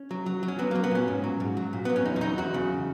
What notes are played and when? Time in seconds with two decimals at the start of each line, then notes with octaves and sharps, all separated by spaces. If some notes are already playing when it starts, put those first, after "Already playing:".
Already playing: C#4
0.11 F#3
0.26 F#3
0.43 F#3
0.48 C#4
0.59 F#3 B3
0.71 A#3
0.75 F#3
0.84 B3
0.91 A#2 C#4
1.08 G#2
1.24 F#3
1.40 G#2
1.57 F#3
1.73 A#2
1.85 F#3 B3
1.96 C#4
2.05 E2 D#4
2.16 C#4
2.21 F#3 D#4
2.38 E2 F#4
2.54 C#3